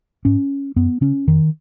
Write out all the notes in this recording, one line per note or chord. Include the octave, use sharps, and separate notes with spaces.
G#2 C#4
F#2 B3
C#3 C#4
F2 D#3